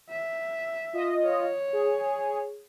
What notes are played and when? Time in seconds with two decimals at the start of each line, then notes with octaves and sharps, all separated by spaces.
0.10 E5
0.93 F4 D#5
1.24 C#5
1.73 G#4